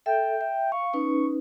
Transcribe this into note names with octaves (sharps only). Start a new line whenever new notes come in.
A4 E5 G5
E5
F5 C#6
C#4 D#4 B4